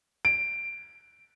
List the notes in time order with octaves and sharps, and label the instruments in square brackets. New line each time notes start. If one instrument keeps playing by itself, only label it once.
[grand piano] D7